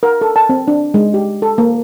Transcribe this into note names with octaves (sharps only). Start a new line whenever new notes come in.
A#4
A4
A5
C4
D4
G#3
G4
A4
A#3